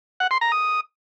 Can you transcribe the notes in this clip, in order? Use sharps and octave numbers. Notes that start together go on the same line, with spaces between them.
F#5
C6
A#5
D#6